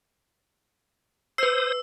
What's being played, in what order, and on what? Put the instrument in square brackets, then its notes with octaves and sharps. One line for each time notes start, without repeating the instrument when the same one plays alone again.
[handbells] B4 C7 [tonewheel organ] C5 D#6 [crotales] E6